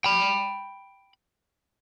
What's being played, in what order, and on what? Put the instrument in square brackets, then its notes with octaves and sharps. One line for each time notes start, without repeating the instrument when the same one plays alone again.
[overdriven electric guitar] G5 B5